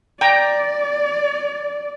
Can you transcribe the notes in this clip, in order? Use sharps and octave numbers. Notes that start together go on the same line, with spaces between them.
D5 G5 A#5